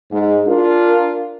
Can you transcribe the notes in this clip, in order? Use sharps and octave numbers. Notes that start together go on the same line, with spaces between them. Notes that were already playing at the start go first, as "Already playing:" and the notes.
G#2 G#4
D4 F4 A#4